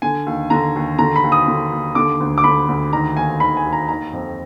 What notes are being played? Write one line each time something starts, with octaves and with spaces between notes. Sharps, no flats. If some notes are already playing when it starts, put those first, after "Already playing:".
D3 G#5
D#2
D3 A#5
D#2
D3 A#5
B5
D#2
D#6
D3
D#2
D3 D6
D2
D6
D3 B5
D2
D#3 A#5
D#2 G#5
D#3 B5
G#5
D#2
A#5
D#3 A#5
F2